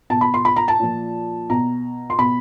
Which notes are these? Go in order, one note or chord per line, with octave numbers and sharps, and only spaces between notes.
B2 A5
B5
C6
B5
A#5
A5
A#2 F3
B2 A#5
C6
B2 B5